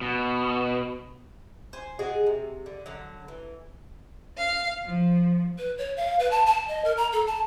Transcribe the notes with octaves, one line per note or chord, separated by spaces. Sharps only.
B2
C5 G#5
C3 G#3 F#4 G#4
C3
D3
D3 F#3
E3
F5
F3
B4
C#5
F5
B4
A5
A5
D#5
A#4
A#5
A4
A5